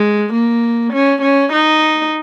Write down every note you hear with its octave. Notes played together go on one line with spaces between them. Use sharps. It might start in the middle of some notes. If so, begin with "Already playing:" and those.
Already playing: G#3
A#3
C#4
C#4
D#4